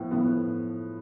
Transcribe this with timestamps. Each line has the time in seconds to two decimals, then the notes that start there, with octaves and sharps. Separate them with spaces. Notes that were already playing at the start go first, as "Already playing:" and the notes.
Already playing: A2 F3 B3
0.11 A2 F3 B3